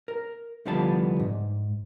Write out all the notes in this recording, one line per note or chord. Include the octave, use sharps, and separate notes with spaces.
A#4
C2 D3 F3 G3 B3 A5
G#2